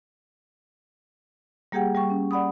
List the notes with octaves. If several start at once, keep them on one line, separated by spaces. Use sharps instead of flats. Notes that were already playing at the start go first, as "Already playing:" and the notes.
G3 A#3 G4 G#4 F#5 G5
G3 G5 C#6
C#4
D5 F#5 B5 D#6